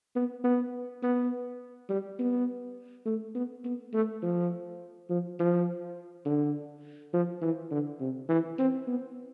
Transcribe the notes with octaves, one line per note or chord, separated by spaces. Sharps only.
B3
B3
B3
G3
B3
A3
B3
B3
A3
F3
F3
F3
D3
F3
E3
D3
C3
E3
C4
B3